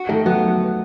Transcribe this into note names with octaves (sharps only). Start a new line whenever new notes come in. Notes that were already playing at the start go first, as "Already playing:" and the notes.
Already playing: F#4
D#3 A3
F#3 B3